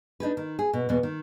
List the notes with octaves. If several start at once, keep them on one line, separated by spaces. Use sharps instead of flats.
D4 D#4 G#4 B4
D#3
G#4
B2
E2 B2 B3
D#3